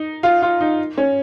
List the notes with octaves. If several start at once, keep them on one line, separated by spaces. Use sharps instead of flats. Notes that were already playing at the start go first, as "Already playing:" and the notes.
Already playing: D#4
F4
F4
D#4
C#4